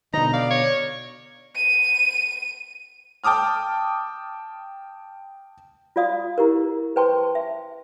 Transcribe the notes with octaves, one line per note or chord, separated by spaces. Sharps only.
B2 D3 D#4 A#5
D5 F5
C#5
D#7
G5 A5 D6 D#6 F6
F4 F#4 D5 F5 D#6
E4 G4 A#4
B4 C5 G5 A5 C6 C#6
E5